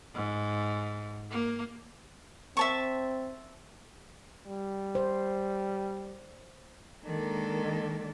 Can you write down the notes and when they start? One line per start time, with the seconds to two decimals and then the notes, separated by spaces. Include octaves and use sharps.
0.14 G#2
1.31 A#3
2.57 C4 E5 A5 C#6
4.47 G3
4.95 C5
7.05 D#3 G#3 A#3 D4 A4 D5